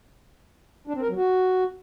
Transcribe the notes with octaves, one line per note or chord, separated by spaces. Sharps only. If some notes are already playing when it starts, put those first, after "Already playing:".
D4
C4
A#4
F#3
F#4